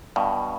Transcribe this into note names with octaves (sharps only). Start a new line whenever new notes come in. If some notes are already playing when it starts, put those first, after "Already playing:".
G2 B2